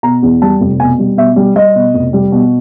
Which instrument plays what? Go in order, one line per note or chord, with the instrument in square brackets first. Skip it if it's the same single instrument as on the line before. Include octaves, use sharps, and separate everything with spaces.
[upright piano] B2 A#5
E2
G3 A5
F1
B2 G#5
G3
B2 E5
G3
G3 D#5
B2
F1
G3
B2